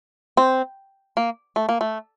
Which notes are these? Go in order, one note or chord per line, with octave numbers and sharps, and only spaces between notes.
C4
A#3
A3
A#3
A3